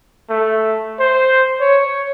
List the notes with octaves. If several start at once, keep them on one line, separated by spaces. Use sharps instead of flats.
A3
C5
C#5